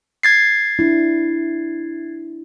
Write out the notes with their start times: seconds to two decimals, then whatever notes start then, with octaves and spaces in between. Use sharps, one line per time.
0.23 G#6 A6 C7
0.79 D4 E4